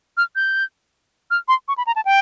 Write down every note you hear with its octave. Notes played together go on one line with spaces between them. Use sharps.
F6
G6
F6
C6
C#6
B5
A#5
A5
G5